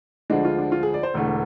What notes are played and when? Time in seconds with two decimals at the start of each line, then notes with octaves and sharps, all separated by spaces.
0.30 D2 D3 F3 G#3 D4
0.45 F4
0.58 D4
0.72 F4
0.83 G#4
0.94 D5
1.03 C5
1.14 E1 E2 D3 A3